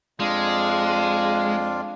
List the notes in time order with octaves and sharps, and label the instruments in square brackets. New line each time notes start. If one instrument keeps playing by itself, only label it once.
[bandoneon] F2 D4 F4 [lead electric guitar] G#3